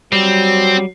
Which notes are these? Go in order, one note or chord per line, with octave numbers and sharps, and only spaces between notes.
F#3 G3 C4